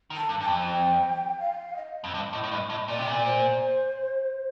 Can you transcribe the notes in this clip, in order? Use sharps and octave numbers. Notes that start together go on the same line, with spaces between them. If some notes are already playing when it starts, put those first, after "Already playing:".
D#3
A5
G2
G2 A5
F2 G5
F5
D#5
F2
G2
A2
A2
G2
A2
A#2 D5
C3
A#2
C5